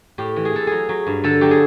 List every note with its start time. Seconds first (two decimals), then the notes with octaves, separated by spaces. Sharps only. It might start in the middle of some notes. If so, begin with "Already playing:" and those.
0.18 A2 G4
0.36 E3
0.45 G#4
0.53 E3 A4
0.67 F#3 G#4
0.89 F#3
1.07 G2
1.24 D3 A4
1.41 F#3 G4
1.51 G#4